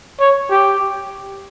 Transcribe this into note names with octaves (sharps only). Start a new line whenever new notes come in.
C#5
G4